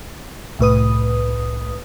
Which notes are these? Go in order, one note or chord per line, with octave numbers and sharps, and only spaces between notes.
C2 A2 B4 D#6